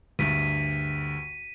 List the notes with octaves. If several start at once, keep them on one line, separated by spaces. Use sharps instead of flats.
D2 G2 B6 D#7